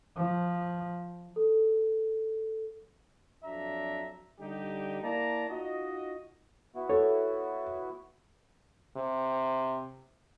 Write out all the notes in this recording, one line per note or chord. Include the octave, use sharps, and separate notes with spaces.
F3
A4
F2 F#3 D4 E5 A#5
D3 G3 D#4 G4
A#3 E4 D5 A5 A#5
D#4 F4 F#4 D#5
B3 E4 F#4
A4 C#5
C3